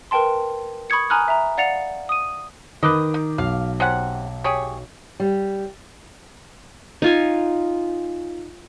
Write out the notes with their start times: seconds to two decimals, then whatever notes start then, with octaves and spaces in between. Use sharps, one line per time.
0.11 A#4 B4 G5 A5 C6
0.90 B5 C#6 D#6 G#6 C#7
1.10 G#5 A#5 B5 D#6 F6 F#6
1.28 E5 A#5
1.58 D5 F5 F#5 A6 C#7 F7
2.09 D#6 D#7
2.83 D#3 B4 D#5 D6
3.14 D#4
3.38 B1 F5
3.80 C3 C#4 F#5
4.44 G4 G#4 C#5
5.20 G3
7.02 D#4 F4 G#5